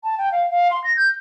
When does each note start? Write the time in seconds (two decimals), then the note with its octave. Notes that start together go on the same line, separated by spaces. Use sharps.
0.04 A5
0.18 G5
0.32 F5
0.51 F5
0.71 C6
0.84 A#6
0.96 G6